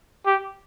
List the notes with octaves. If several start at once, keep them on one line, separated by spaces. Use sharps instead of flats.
G4